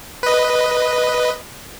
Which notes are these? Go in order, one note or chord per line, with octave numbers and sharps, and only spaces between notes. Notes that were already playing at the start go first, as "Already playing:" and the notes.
B4 D#5